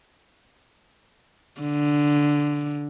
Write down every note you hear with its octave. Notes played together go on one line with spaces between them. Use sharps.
D3